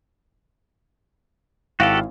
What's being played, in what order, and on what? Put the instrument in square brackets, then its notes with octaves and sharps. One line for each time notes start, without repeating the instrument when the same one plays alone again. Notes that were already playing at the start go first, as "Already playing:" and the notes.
[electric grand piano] G#1 E4 F5 [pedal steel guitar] F#4 G4 A4